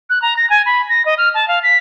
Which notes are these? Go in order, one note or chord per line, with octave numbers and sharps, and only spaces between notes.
F#6
A#5
A#6
G#5
B5
A#6
D#5
F6
A5
F5
B6